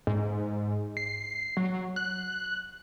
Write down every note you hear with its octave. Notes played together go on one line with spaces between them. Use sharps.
G#2
C7
F#3
F#6